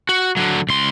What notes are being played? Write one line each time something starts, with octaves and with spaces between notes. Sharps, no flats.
F#4
D3 F#3
C#2 C6